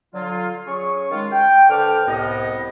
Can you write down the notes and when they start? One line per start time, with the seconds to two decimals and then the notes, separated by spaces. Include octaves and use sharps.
0.14 D3 F#3 F4
0.66 C#4 G#4 C#6
1.11 D#3 G#3 F4
1.32 G5
1.69 D3 A4 B4 C5 D6 F6
2.06 C2 A2 B3 D#5